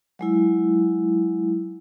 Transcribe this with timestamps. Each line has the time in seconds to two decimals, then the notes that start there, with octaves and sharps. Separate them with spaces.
0.19 F#3 G#3 E4